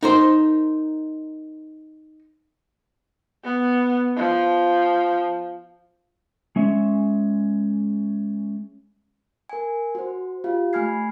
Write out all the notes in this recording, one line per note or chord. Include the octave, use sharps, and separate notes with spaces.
D#4 A#4 C5
B3
F3
G#3 C#4 E5
A#4 G#5
F#4 C5
F4 G4 F5
A3 G#5 B5 F6 G#6 C7